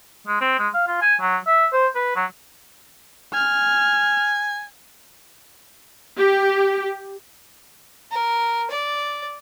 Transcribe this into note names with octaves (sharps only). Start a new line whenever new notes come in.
G#3
C4
G#3
F5
F4
G#5
F#3
E5
C5
B4
F#3
G#5 F6
G4
A#4
D5